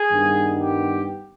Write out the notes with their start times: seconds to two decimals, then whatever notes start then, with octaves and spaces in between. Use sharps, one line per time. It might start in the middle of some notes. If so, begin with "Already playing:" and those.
Already playing: G#4
0.11 G2 D#3 G3 B3
0.60 G4